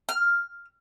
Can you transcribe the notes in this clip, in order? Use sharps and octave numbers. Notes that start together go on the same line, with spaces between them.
F6